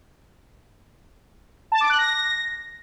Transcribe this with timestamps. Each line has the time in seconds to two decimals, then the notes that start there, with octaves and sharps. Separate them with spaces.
1.72 A5
1.81 D6
1.90 F#6
1.99 A#6